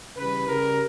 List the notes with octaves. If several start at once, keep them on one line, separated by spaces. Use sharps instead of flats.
C#3 E3 G3 B4
C#3 G3 A#4